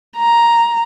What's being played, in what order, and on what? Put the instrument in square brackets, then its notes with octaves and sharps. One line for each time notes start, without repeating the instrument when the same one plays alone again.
[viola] A#5